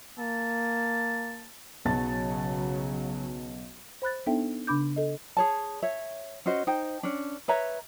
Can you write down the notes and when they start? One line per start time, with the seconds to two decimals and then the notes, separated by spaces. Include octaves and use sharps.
0.19 A#3 A5
1.85 B1 C#3 F#3 A5 A6
4.02 C5 B5 F#6 A6
4.27 B3 D4 D#4 A4 E5 G5
4.67 C#3 D4 B5 D6 G6
4.96 A4 D#5
5.37 G#4 C#5 A5
5.83 C#5 E5
6.46 C#4 F#4 C5 D#5
6.67 D#4 C5 G5
7.03 C#4 D4
7.48 B4 C#5 E5 A#5